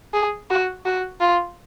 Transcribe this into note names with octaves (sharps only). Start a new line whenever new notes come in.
G#4
F#4
F#4
F4